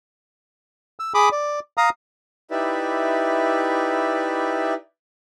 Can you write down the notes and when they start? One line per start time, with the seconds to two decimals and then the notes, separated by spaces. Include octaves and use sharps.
1.00 E6
1.14 G#4 B5 D6 D#6
1.32 D5
1.78 F5 A#5 D#6
2.51 D#4 E4 G4 B4 D5 E5